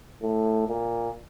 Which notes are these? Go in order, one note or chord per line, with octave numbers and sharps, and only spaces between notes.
A2
A#2